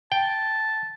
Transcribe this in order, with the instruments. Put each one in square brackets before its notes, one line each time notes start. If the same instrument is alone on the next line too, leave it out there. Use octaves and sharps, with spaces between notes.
[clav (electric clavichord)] G5 [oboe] A5